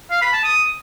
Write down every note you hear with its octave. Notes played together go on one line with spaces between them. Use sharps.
F5
B5
A5
D#6